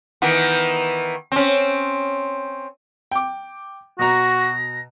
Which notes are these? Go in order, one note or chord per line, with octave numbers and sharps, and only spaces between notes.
D#3 E3 B3
C4 C#4
G5 D6
B2 F#4 A#5 A#6